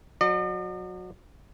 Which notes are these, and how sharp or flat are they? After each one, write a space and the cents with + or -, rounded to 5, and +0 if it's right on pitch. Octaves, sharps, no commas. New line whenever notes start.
F#3 -20 D#5 -45